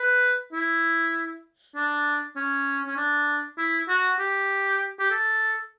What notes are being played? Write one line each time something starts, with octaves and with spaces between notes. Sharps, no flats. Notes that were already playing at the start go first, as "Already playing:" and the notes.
Already playing: B4
E4
D4
C#4
C#4
D4
E4
F#4
G4
G4
A4